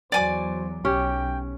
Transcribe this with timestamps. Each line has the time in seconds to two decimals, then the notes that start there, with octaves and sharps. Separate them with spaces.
0.12 E2 F#3 C5 D5 G#5 D6
0.85 B1 C#4 G4 G5